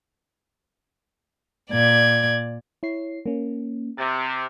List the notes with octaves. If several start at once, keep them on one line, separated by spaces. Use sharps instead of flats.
A#2 D5 G#6
E4 C#5 C7
A#3 C#4
C3 A6